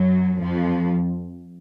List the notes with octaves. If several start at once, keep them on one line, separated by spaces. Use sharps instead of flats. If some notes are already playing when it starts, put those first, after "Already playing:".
Already playing: F#2 F#3
F2 F3